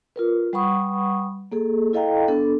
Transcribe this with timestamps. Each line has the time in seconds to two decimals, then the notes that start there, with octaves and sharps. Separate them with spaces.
0.16 F4 A#4 B4
0.53 G3 B4 F#5 B5 C#6 D#6
1.52 A#3 G#4 A4
1.93 E4 A4 D#5 F5 G5 A#5
2.28 B3 D4 A4